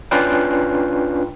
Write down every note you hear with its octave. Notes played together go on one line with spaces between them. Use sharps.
C#4 D4 F4 B4 F5 G5